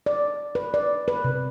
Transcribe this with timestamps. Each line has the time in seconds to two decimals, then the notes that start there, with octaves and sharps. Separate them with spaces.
0.06 D5
0.55 B4
0.74 D5
1.08 B4
1.24 C3